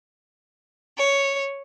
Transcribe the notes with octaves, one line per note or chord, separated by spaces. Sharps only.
C#5